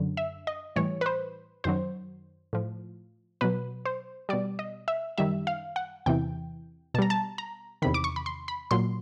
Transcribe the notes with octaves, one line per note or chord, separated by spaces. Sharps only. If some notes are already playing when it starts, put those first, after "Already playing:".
Already playing: F#2 D3 F#3
E5
D#5
A2 E3 G3 C#5
B4
C5
F#2 D#3 F#3 C5
A2 F3
B2 F#3 B4
C5
B2 G3 D5
D#5
E5
F#2 D#3 G3 E5
F5
F#5
E2 C3 E3 G5
B2 G3 A5 A#5
A5
A#5
E2 C3 D#3 B5
D6
C#6
B5
C6
B5
A#2 F#3 C6